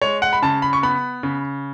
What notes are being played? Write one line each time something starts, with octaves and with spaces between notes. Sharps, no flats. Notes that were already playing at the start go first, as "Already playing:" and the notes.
G#3 C#5
F#5
B5
C#3 A5
B5
C#6
B3 B5
C#3